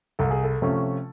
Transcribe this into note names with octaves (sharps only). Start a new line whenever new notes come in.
C2 A4
G#4
A4
C3 F3 A3 C#4